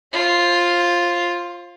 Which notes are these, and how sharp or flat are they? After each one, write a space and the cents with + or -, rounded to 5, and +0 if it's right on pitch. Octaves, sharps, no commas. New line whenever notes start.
F4 +0 C5 +30